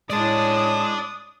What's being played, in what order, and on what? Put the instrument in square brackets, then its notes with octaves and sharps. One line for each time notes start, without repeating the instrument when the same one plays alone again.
[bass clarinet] A2 [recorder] G#3 [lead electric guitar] D5 A5 [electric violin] D#6